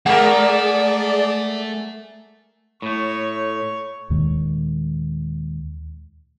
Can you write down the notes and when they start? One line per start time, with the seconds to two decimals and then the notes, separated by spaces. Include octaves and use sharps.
0.06 G#3 A3 G#4 A#4 D5 F#5
2.82 A2 A3 C#5
4.10 D#2 A#2 D#3 G#3